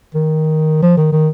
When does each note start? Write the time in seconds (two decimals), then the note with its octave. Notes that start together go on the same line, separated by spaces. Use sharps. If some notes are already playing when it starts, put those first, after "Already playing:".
0.14 D#3
0.82 F3
0.97 D#3
1.12 D#3